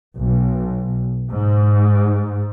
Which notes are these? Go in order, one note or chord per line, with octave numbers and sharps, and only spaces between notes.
B1
G#2